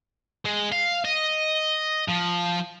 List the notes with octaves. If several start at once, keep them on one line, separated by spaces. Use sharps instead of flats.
G#3
F5
D#5
F3